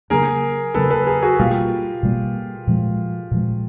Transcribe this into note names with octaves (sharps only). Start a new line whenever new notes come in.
C#3 F#3 A#3 D4 G#4 A#4
C#3 F#3 A#3 D4 A4 B4
A4 B4
G#4 A#4
F#4 G#4
B2 G3 A#3 F4 G4
B2 G3 A#3
A#2 F3 G#3
A#2 F3 G#3